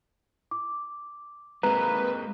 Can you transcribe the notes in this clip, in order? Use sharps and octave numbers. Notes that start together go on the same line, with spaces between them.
D6
G#3 A#3 C4 B4 A#5